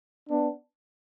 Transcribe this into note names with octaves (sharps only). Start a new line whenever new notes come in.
B3 D4